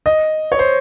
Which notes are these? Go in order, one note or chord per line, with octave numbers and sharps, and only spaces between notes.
D#5
C#5
C5